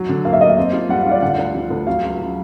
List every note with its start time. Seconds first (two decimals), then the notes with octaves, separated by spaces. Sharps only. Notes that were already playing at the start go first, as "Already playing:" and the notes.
Already playing: F#3
0.09 D3
0.25 A#3 F5
0.33 E5
0.41 A#3 D#5
0.50 E5
0.57 C4
0.73 F4
0.89 G3 F#5
1.01 F5
1.06 F4
1.11 D5
1.22 D3 F#5
1.38 D2
1.55 F3
1.70 D2
1.87 F#3 F5
2.03 C#2
2.20 F#3